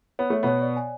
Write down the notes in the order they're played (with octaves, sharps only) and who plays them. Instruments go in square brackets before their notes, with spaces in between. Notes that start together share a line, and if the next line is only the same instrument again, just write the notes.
[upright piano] B3 [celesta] C#5
[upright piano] A3 [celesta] C#5
[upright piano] B2 B3 [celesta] C#5
[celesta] D5
G#5